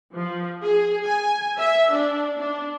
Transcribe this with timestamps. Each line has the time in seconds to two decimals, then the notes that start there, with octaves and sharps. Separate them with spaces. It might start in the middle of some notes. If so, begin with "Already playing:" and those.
0.13 F3
0.63 G#4
1.06 G#5
1.59 E5
1.92 D4
2.38 D4